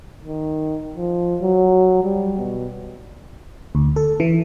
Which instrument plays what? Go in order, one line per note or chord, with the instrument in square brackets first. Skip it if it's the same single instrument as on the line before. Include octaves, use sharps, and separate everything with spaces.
[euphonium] D#3
F3
F#3
G3
B2
[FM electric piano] D2
A4
E3